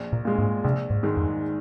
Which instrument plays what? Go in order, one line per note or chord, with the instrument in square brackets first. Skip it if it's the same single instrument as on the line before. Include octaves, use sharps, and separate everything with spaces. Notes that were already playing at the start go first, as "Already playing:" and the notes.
Already playing: [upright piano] A#1
[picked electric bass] A#2
[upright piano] A#2 G#3
[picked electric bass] G#2
[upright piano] A#1 [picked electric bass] C3
[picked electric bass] G#2
[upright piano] G#2 D#3 G#3
[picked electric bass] F2